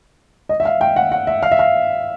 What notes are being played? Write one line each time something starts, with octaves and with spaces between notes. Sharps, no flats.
D#5
E5
F5
G5
F#5
F#5
E5
F5
E5
F5